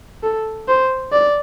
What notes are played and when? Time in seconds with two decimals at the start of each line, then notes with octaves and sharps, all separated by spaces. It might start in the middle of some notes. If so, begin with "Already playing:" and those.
0.23 A4
0.68 C5
1.12 D5